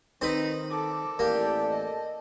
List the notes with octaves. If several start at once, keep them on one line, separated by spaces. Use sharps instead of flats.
D#3 C4 D#4 B4
A4 D6
A1 E3 A#3 G4 D5
D#5